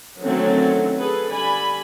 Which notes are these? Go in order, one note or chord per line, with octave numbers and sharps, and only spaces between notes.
D3 D#3 F#3 A3 C4 C#4
G#4 A4 B4
D3 G3 D5 G#5 B5